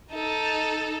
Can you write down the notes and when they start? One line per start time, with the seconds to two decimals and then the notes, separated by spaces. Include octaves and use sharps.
0.13 D#4 A4